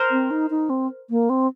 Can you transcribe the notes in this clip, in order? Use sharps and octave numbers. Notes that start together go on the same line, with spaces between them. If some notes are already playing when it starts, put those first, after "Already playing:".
Already playing: A#4 C5
C4
D#4
D#4
C4
A#3
C4